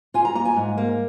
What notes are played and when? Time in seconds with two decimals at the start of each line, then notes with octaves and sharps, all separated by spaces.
0.14 F4 G#5
0.25 A#5
0.35 A#3 A#5
0.45 G#5
0.56 G#2
0.78 A#3